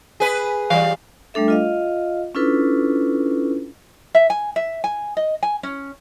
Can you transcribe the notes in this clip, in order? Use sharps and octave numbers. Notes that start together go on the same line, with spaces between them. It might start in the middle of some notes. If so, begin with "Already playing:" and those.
G#4 B4
E3 G3 F5
G3 A3 D4 A4 E5
F4 D#5 F5
C#4 D4 E4 F4 A4 B4
E5
G#5
E5
G#5
D#5
G#5
C#4